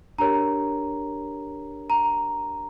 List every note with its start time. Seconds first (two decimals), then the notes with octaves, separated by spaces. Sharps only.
0.18 D4 G4 A#4 C#5 A#5
1.90 A#5